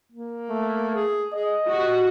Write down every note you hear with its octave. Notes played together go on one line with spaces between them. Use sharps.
A#3
A3
G#4
G#4 D#5
F#4 G4